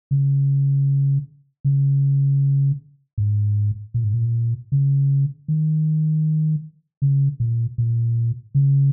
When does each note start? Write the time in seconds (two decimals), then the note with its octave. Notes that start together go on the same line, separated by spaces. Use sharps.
0.11 C#3
1.65 C#3
3.18 G#2
3.94 A#2
4.04 G#2
4.14 A#2
4.72 C#3
5.48 D#3
7.02 C#3
7.40 A#2
7.78 A#2
8.55 C#3